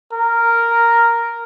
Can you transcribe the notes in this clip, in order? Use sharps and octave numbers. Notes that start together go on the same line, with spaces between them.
A#4